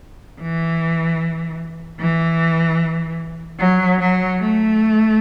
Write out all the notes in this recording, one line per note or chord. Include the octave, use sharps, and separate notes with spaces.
E3
E3
F#3
F#3
A3